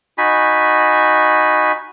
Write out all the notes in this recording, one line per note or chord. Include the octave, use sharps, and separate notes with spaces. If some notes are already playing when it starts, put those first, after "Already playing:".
D#4 F#4 G#5 B5